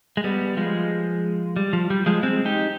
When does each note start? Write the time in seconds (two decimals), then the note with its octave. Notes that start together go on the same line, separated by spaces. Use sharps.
0.17 G#3
0.24 G3 B3
0.57 F3 G#3
1.56 G3
1.73 F3
1.90 G3
2.06 F3 G#3
2.23 G#3 C4
2.45 D#4 G4